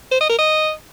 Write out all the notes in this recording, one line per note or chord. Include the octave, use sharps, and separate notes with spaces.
C5
D#5
A#4
D#5